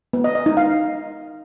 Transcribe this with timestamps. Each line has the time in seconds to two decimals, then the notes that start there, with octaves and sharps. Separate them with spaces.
0.13 B3
0.24 D#5
0.35 D#5
0.46 D#4
0.57 F5